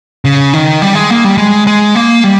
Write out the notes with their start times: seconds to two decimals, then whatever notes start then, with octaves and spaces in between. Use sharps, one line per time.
0.25 C#3
0.53 D#3
0.82 G3
0.95 G#3
1.10 A#3
1.24 G3
1.38 G#3
1.67 G#3
1.95 A#3
2.24 G3